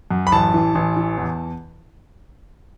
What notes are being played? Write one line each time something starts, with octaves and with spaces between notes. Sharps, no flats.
F#2
B5
A1 A5
E3
A1
E3
E2